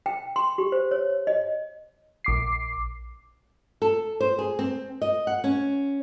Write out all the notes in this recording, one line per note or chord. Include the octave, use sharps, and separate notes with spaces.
G5
C6
G4
C5
C#5
D#5
A#1 D6 C7
A4
C5
G#4
C4
D#5
F#5
C#4